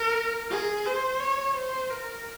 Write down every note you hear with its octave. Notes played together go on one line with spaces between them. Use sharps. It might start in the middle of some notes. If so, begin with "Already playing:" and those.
Already playing: A#4
G#4
C5
C#5
C5
A#4